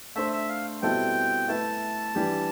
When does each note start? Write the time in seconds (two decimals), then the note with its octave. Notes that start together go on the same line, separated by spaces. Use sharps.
0.16 A3 D4 A4 C5 E5
0.33 E5
0.49 F5
0.82 B2 G3 C4 E4 A4 G5
1.48 A3 E4 B4 A5
2.15 E3 G3 D4 G4